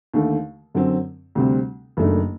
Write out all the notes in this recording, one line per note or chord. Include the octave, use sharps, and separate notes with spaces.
D#2 D3 A3
F#2 D3 F#3 C4
D2 C3 G3 C4
F#1 F#2 D#3 A3 D4